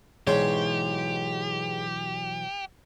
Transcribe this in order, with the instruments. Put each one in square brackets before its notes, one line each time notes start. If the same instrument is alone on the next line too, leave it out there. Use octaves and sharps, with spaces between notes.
[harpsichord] G#2 C5 [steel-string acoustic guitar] B2 E3 F#3 [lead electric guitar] G4 [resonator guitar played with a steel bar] C#5